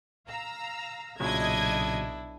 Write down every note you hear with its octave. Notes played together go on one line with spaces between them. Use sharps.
F5 A#5 E6
B1 A#2 C#3 F#3 D4 E4 D#5 G#6